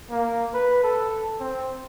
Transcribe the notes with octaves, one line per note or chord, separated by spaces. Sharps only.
A#3
B4
A4
C4